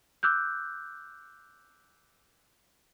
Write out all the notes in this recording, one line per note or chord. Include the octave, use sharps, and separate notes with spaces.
D6 E6 F#6 G6